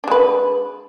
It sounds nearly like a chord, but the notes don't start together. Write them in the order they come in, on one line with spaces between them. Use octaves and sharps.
D4 G#3 B4